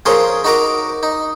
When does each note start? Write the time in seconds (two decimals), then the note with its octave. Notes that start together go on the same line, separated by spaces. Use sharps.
0.06 F3 C#4 G#4 A#4 C6
0.44 D#4 F#4 A#4 A#5 D6
1.03 D#4